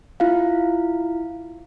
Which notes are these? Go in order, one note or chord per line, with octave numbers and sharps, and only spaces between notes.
E4 F4 F5